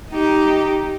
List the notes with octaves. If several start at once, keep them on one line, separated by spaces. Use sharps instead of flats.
D#4 G4